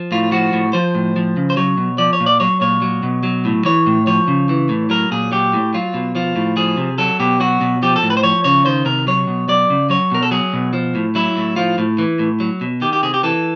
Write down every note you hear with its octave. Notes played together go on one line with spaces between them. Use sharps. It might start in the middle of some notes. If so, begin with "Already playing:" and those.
Already playing: F3
A2 F4
F3 F#4
A2
F3 C5
A2
F3
C#3
C5
F#3 C#5
B2
F3 D5
C#5
A#2
D5
F#3 C#5
A#2 C#5
F#3
B2
F#3
A2
E3 C#5
A2
F3 C#5
C#3
E3
A2
F#3 A#4
A#2 G#4
F#3 G4
A2
F#3 F4
B2
F3 F4
A2
F3 G#4
C3
F#3 A4
B2 G4
F#3 F#4
B2
F3 G4
A4
A2
B4
C5
F3 C#5
C#3 C#5
D#3 C5
C3 A#4
F#3 C#5
B2
F#3 D5
C#3
F#3 C#5
B2 A#4
A4
F#3 G#4
B2
F3
A2
F#3 E4
A2
F3 F4
A2
E3
A2
F#3
B2
D#3 G4
G4
C3 G#4
G4
E3 A4